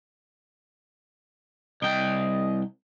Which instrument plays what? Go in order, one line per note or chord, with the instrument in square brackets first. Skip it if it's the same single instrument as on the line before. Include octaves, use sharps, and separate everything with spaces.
[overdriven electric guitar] C2 G5 [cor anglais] D#5